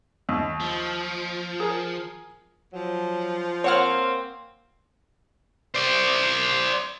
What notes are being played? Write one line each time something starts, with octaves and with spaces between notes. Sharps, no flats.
D#2
F3
G#4 A#4
F3 F#3
A#3 C4 C#5 F#5 F6
C5 D5